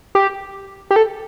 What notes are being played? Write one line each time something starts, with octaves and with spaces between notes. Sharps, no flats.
G4
G4
A4